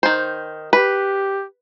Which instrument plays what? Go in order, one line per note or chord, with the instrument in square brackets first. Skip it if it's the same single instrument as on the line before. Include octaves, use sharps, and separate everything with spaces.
[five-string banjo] D#3 C5
[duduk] G4 [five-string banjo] B4